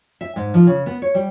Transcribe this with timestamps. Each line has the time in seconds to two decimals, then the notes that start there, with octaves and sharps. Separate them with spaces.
0.21 E5
0.36 G#2
0.54 F3
0.67 C#3
0.86 B3
1.02 C#5
1.15 G3